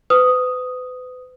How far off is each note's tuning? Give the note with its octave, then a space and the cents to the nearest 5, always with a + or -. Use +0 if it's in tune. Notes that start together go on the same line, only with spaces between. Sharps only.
B4 +40 D#6 +0